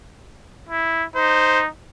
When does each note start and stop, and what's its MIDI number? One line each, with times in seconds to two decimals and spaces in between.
0.69 1.04 64
1.16 1.68 63
1.16 1.62 72